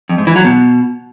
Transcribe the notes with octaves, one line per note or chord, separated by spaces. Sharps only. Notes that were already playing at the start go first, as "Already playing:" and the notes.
F2
G#2
E3
F#3
B2